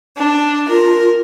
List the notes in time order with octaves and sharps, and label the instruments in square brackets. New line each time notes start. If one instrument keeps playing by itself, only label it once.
[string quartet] D4
[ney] F4 [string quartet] A#4